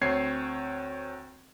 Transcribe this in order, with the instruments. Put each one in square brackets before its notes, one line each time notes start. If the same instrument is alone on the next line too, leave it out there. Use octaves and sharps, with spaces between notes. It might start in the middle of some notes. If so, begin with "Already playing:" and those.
[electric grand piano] D2 C4 C#5 G#6 C7